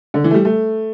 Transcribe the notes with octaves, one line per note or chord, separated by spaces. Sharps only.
D3
E3
A3
G3
A3